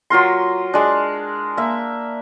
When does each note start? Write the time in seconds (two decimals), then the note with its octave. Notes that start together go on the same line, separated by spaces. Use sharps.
0.10 F#3 F4 A#4 C6
0.74 G#3 D4
1.57 A#3 E5